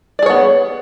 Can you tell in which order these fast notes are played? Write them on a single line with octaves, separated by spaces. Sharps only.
D5 G#4 C#5 B3